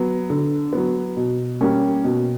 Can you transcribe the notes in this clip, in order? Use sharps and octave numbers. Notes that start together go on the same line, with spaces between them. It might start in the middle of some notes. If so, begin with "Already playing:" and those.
Already playing: F#3 B3
D3
F#3 B3
B2
G3 A#3 C#4
B2